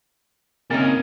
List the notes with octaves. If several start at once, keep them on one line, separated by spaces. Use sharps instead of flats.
C#3 A#3 C4 C#4 D#4 A#4